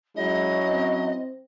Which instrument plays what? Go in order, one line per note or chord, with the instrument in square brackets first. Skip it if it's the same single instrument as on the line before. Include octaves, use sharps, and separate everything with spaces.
[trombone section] F#3 C#4 E4 [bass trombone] G#3 [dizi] D#5
[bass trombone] C4